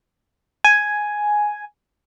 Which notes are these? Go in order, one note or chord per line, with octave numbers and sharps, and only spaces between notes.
G#5